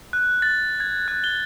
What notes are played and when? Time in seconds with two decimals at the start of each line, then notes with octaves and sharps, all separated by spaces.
0.13 F#6
0.42 A6
0.80 G#6
1.08 F#6
1.24 G7